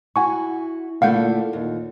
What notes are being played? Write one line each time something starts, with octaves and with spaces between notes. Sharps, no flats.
E4 F#4 F#5 G#5 C#6
A#2 D3 A3 E4 F5 F#5 G6
D#2 A#2